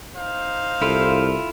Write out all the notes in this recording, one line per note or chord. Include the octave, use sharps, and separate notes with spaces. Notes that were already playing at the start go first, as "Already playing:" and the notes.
D#4 C5 F5
C2 E4 F4 A4